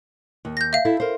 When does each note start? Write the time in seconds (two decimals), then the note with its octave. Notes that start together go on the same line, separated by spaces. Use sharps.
0.45 D#2
0.57 G6 A#6
0.73 E5 F5
0.85 E4 A4
1.00 A#4 C5